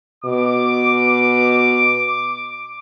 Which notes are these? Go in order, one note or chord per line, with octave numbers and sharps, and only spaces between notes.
B2 D6